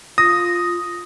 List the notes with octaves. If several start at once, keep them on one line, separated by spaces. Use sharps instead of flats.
F4 D#6 A#6